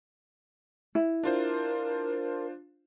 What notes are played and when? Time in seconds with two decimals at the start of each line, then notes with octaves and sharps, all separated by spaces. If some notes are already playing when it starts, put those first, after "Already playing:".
0.95 E4
1.24 D4 F4 A#4 C5